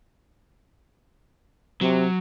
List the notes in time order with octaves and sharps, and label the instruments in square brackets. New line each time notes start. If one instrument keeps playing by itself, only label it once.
[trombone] C3 [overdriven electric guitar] F#3